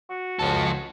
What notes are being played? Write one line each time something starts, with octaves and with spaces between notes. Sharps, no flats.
F#4
C#2 F3 A4